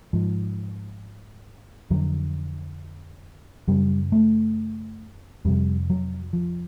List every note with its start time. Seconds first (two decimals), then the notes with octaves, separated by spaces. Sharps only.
0.13 G#2 F3
1.90 F2 D3 F#3
3.68 F#2 C#3 G3
4.12 A3
5.45 F2 C3 G3
5.90 F#3
6.33 F3